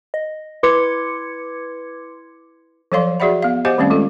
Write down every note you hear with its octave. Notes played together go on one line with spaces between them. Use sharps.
D#5
E4 B4 C6 D6 G#6 C#7
F3 F#3 A4 D5 F5 C6
F#4 G#4 D5 E5 F#5 B5
B3 F5
G4 C5 D#5 F#5 G#5 D6
D#3 G3 A3 C4 C#4 F5
G#3 F4 A4